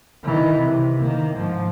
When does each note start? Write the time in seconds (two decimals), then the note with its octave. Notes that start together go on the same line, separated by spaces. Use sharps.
0.24 D#3 E3
0.59 C3
0.98 D#3 A#3
1.36 G#2 F3